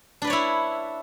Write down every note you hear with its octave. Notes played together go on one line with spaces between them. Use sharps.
D4 E4 B4 C#5 D5